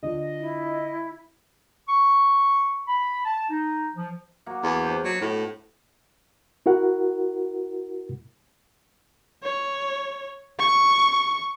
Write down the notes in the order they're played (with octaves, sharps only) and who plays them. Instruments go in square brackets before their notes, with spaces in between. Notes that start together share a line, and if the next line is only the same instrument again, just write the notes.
[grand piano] D3 F3 [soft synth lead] D#5
[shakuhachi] E4
[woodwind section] C#6
B5
A5
D#4
F3
[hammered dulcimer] F#3 A#3 F#4
[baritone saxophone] E2
[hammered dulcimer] D4 G4 C5
[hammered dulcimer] B2 [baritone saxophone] F#3
[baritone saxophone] A2
[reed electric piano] E4 F#4 A#4 F#5
[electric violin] C#5
C#6